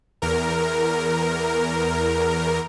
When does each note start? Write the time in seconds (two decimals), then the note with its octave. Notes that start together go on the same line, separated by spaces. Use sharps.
0.22 E2 A#4